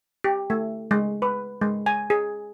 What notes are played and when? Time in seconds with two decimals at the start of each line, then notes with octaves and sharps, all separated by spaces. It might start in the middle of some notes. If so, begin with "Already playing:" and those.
0.24 G4
0.50 A3
0.91 G#3
1.22 B4
1.61 G#3
1.86 G#5
2.10 G#4